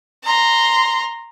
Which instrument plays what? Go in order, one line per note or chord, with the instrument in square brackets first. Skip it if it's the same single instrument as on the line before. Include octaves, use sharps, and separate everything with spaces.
[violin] A#5 C6